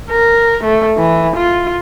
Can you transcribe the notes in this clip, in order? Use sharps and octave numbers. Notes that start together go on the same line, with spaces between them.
A#4
A3
E3
F4